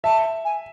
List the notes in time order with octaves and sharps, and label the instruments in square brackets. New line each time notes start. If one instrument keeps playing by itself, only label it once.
[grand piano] E5 [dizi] A5
[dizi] G#5